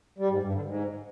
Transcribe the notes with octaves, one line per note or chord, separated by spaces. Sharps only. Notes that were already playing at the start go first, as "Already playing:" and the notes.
G3
G#2
G2
D3
G#2